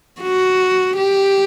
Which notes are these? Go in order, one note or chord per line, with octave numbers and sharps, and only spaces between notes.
F#4
G4